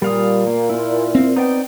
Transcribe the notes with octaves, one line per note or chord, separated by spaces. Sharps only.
A#2 G3 F5 D#6
A#3
E4 F4
C4
B3 D#4 D5 G5